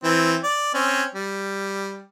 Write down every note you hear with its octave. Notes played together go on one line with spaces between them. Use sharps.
E3 C4
D5
C4 C#4
G3